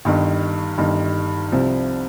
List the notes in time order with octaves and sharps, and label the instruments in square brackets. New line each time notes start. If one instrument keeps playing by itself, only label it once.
[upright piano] G1 G2 D#3
G1 G2 D#3
C2 C3 F3